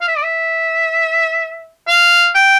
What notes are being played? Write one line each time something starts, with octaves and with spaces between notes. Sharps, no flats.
F5
E5
D5
E5
F5
G5